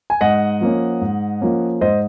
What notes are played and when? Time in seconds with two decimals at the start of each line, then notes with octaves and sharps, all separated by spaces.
0.10 G#5
0.21 G#2 D#5 F#5
0.61 F3 A#3 C#4
1.01 G#2
1.41 F3 A#3 C#4
1.81 G#2 C5 D#5